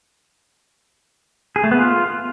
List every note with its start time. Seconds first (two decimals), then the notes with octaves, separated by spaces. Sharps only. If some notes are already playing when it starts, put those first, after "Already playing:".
1.56 G#4
1.64 A3
1.71 B3
1.79 F4